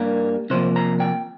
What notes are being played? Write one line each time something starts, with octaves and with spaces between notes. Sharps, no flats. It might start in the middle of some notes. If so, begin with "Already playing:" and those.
Already playing: G2 G3 A#3 A#4
C3 F3 A#3 C5
A#5
G5